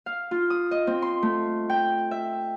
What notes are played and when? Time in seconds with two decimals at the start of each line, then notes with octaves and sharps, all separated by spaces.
0.06 F5
0.31 F4
0.50 D#6
0.71 D#5
0.87 C4
1.02 C6
1.22 A3
1.70 G5
2.11 E5